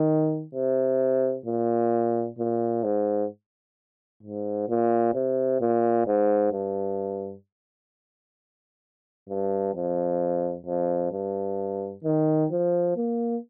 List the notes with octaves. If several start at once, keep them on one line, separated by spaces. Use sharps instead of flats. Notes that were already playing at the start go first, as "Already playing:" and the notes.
Already playing: D#3
C3
A#2
A#2
G#2
G#2
A#2
C3
A#2
G#2
G2
G2
F2
F2
G2
D#3
F3
A#3